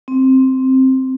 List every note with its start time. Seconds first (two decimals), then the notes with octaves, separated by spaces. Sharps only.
0.08 C4